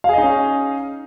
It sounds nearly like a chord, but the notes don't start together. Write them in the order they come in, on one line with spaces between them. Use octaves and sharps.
F5 G#4 D#5 D#4 C#4